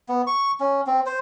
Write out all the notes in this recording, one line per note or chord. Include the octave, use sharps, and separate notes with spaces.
B3
C#6
C#4
C4
C5